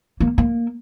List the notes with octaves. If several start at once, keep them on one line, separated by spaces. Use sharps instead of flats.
A#3
A#3